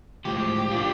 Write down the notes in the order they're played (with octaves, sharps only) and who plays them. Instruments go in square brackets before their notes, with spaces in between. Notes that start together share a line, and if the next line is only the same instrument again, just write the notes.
[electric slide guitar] A2 F3 G#3 [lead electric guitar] G4
[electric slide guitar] B2 F#3 A#3 D4 F4